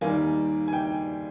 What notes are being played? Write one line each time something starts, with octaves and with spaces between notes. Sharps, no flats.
D#2 D#3 G3 A#3 G#5
G#5
G5